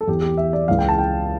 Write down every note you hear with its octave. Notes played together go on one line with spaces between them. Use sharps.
A4
E2 E3 G4
G4
E5
D5
C#2 C#3 E3 F5
G5
A5
G5